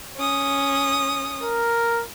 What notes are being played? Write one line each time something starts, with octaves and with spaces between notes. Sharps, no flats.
C#4 D#6
A#4